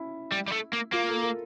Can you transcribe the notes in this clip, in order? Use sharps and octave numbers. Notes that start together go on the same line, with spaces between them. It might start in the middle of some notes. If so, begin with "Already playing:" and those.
Already playing: C#4 E4
G3
G3
A3
A#3
A#3 F4
A4
A#4